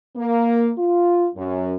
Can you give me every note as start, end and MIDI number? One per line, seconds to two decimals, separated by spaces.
0.16 0.71 58
0.78 1.27 65
1.35 1.74 42